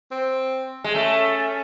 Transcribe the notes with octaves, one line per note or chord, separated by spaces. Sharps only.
C4
G#3
A3 C#4